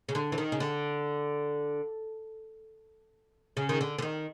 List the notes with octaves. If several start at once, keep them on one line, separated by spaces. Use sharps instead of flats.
C#3
D3
E3
D#3
C#3
D3
C#3
D#3
D3
D3
D#3